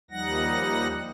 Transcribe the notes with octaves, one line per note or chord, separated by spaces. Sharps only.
D#2 F3 G3 D#4 F#5 A#6